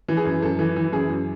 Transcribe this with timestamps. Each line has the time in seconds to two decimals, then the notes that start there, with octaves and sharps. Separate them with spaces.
0.08 E3
0.17 G#4
0.25 F#2
0.42 F#2 A4
0.59 E3
0.76 E3
0.92 F#2 G#4
1.10 F#2